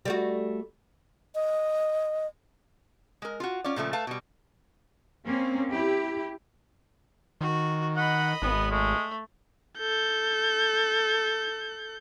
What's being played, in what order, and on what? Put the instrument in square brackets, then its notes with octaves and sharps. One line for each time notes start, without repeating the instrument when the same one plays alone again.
[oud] G3 A3 F#4
[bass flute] D#5
[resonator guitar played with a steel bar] G#3 A#4
F4 F#4
C#4 F4 D5
A#2 C#3 F3 A3
A3 B4 F5 A5
B2 G3
[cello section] A#3 C4 C#4
E4 G4
[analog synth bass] D#3 [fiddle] F#4
[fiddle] D#5 B5 [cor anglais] F#5
[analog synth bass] G#1 [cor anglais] B3
[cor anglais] G#3 [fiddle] A3
[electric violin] A4 G6